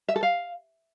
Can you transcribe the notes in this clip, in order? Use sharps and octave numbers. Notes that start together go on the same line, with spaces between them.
E5
A4
F5